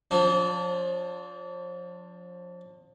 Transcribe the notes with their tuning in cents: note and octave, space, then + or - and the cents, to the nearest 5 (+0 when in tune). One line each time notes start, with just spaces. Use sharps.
F3 +30 D4 -35